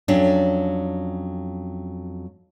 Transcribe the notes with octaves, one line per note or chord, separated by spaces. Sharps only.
F2 F#3 C#4 D4